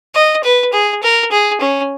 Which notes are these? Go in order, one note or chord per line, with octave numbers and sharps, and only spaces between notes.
D#5
B4
G#4
A#4
G#4
C#4